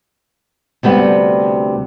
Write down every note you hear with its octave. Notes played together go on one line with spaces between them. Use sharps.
D2 C3 G3 B3